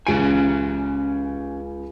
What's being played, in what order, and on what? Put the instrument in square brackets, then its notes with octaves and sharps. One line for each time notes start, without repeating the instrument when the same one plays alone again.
[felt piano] C#2 D7 [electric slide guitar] C#4 G4 G#5